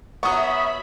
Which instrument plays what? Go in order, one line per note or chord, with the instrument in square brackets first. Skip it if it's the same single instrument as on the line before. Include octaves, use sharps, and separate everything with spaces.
[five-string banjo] F#3 B3 [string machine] E5 B5 [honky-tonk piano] C#6 D#6